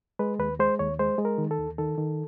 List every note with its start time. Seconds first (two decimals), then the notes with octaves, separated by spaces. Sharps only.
0.19 G#3 B4
0.39 D#2 B4
0.60 G#3 C5
0.79 D#2 C#5
0.99 G#3 C5
1.18 G#3
1.25 A#4
1.38 D#3
1.51 A4
1.58 D#2
1.78 D#3 A4
1.98 D#3